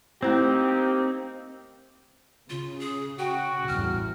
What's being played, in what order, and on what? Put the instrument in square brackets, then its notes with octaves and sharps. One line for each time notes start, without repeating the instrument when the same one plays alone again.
[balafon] A3 E4 C5 [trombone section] A#3 D#4 G4 [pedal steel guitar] C4
[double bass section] C#3 [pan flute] F4
[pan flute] G#4
[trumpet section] F#4 [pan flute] G5
[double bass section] A1 E2 G2 [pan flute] F6